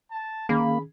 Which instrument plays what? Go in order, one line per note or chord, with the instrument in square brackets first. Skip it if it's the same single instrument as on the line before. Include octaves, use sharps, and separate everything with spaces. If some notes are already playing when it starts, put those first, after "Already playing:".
[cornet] A5
[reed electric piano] D#3 C#4 G#4 [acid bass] A#3 [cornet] B5